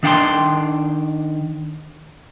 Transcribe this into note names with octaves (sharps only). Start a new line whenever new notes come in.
D#3 D4 F#5 G5 C6